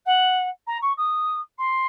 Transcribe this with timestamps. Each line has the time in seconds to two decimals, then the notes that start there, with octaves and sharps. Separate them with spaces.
0.05 F#5
0.67 A#5
0.81 C#6
0.97 D#6
1.58 C6